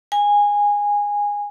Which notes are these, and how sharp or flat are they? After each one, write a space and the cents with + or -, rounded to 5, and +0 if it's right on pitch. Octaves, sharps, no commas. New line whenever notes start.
G#5 -15